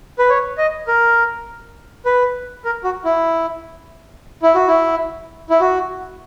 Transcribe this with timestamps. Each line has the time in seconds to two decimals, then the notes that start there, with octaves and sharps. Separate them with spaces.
0.19 B4
0.29 C#5
0.58 D#5
0.88 A#4
2.06 B4
2.65 A#4
2.84 F#4
3.05 E4
4.43 E4
4.55 F#4
4.68 E4
5.50 E4
5.61 F#4